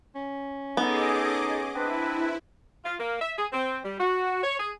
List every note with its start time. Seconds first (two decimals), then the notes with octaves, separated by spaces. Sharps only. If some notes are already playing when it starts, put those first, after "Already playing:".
0.15 C#4
0.77 B3 D#4 G#4 A4 D#5 D6
1.75 C4 D4 E4 B4
2.85 F4
3.00 A#3
3.22 E5
3.38 G#4
3.53 C4
3.85 G3
4.00 F#4
4.43 C#5
4.60 G#4